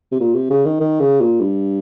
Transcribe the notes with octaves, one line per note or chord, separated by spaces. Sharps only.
C3
A#2
C3
C#3
D#3
D#3
C#3
A#2
G2